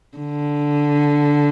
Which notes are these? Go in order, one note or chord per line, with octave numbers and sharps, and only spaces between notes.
D3